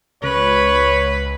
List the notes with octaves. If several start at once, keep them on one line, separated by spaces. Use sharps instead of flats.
C#2 B4 C#5